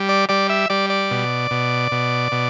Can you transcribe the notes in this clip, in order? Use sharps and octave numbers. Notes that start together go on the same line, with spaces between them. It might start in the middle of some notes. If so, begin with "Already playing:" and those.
Already playing: G3
D5
G3 D5
E5
G3 D5
D5
B2
B2
B2
B2